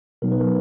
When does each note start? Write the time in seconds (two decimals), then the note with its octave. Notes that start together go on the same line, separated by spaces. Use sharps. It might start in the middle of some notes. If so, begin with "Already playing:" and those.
0.22 B2 F#3 B3 D#4 A#4
0.31 B4
0.40 A#4